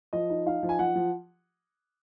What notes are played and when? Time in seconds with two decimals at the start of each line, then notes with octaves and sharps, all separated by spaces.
0.13 F3 D#5
0.30 D#4
0.46 D#4 F5
0.63 F3
0.69 G#5
0.79 F3 F#5
0.96 F3